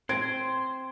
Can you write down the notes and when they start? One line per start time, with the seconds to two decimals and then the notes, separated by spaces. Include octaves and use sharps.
0.09 C4 C5 G#6 D7